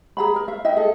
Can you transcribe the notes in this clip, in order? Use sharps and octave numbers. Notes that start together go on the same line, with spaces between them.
G#4 A#5 B5
A#4
E5 F5
E4 D#5 E5 G5
G#4 A4